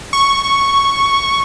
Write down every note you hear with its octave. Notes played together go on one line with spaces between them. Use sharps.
C#6